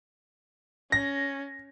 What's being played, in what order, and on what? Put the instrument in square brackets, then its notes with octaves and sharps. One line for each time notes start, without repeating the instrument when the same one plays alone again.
[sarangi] C#4 [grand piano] A#6